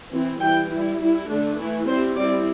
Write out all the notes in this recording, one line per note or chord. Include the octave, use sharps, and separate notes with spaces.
E3 C4 E4
E3 G3 E4 G5
G3 E4
G3 E4
D3 A3 D4
E3 A3 E4
G3 C4 E4 C5
G3 C4 E4 D5